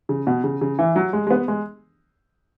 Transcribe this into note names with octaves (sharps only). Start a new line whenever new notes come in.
C#3
B2
C#3
C#3
E3
F#3
G#3
G#3
B3
G#3